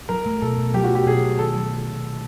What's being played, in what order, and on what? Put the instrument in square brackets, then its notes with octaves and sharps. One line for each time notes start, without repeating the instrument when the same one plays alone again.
[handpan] F#3 [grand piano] A#4
[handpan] A3
[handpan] B2 [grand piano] A4
[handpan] B2
[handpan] F#3 [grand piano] G4
[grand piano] F#4
[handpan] A3
[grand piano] G4
[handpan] B2 [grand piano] G#4
[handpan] B2
[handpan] D#3 [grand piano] A4
[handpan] F#3
A3
C3
D#3